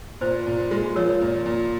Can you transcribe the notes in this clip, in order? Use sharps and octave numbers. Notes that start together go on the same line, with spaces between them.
A#2 C5
A#2
G#3
F3 A#4 C#5
A#2
A#2